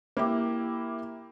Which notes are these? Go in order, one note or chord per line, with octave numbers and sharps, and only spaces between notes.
A#3 E4 G4